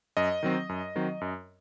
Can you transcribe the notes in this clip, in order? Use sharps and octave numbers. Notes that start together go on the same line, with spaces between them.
F#2 D#5
D#3 F#3 C4
F#2
D#3 F#3 C4
F#2